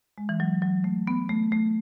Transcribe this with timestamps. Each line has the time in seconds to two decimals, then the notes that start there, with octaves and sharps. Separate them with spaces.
0.18 G#3
0.29 E3
0.40 F#3
0.62 F#3
0.84 A3
1.07 B3
1.29 A3
1.52 A3